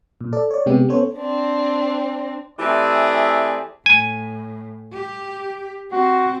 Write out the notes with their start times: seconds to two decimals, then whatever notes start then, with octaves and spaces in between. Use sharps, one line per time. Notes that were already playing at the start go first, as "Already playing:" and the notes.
0.21 A#2
0.33 A4 D5
0.51 C#5 D5
0.66 C3 G#3 B3 G4
0.89 B3 C#4 A4 C5 C#5
1.14 C4 D4
2.59 E3 A3 C4 G4 G#4 D5
3.86 A2 G#5
4.93 G4
5.92 C4 F#4